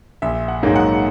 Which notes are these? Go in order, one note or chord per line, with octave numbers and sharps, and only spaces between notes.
A#1 E5
F#5
G#2 F#3 A#3 D#4
F#5